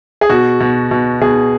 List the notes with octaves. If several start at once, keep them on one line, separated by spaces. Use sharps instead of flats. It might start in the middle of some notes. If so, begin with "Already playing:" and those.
G#4
B2 F#4
B2
B2
B2 G#4